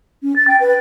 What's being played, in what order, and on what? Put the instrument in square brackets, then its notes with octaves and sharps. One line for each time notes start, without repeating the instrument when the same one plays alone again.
[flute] C#4
A6
G5
B4